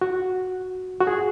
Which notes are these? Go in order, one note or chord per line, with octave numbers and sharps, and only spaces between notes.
F#4
F#4
G#4